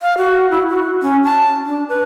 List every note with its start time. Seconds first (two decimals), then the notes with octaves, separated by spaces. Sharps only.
0.02 F5
0.18 F#4
0.51 E4
0.69 F#4
1.02 C#4
1.24 A5
1.66 D4
1.89 B4